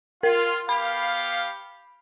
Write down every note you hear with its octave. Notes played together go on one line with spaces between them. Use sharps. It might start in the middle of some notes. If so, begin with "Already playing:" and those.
F4 A#4
B3 G4 F5 B5